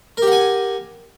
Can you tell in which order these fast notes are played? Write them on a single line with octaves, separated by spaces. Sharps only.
A#4 G4 F#5 G#5